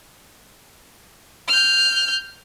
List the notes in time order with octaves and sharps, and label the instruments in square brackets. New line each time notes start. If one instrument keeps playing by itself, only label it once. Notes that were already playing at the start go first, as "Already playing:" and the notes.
[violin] F6 G6